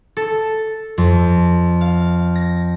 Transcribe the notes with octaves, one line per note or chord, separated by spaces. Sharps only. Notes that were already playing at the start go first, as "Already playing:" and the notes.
A4
F2
F5
A#6